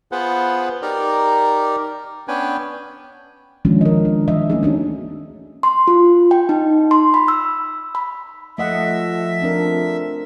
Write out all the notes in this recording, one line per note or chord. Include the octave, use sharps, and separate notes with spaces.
B3 F4 G#4 B4 C5 F#5
D#4 G4 A#4 D5 A#5
B3 C#4 D4 B4 G5 G#5
D#3 F3 G#3 C#4 D4 F4
A#4 D#5
D4
E3 D#5 E5
A3 A#3 C4 C#4 D#4 G#4
C#4 D4 F#4
C6
F4
G5
D#4
C6
B5
E6
B5
F3 A3 D#5 E5 F#5
C4 D4 A#4